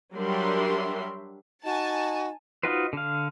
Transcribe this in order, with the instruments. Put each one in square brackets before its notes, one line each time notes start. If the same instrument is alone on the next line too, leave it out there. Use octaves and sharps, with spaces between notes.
[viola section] F#3 G3 D4 A#4 E5 C6
[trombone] D#4 [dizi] F#4 [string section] G#5 A5
[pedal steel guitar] D#4 F4 F#4 B4 C5
D3 F5